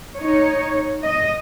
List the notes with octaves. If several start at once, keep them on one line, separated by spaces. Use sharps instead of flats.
D#4 C#5
D#5